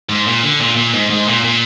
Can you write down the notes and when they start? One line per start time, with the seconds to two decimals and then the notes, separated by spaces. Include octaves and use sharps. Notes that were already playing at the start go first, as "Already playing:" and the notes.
0.09 G#2
0.27 A#2
0.43 D3
0.60 A#2
0.77 A#2
0.94 G#2
1.10 G#2
1.27 A#2
1.44 A#2